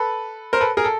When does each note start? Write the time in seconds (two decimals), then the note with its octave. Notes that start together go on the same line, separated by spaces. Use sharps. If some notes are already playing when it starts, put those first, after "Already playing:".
Already playing: A4 B4
0.53 A#4 C5
0.61 A4 B4
0.77 G#4 A#4
0.84 A4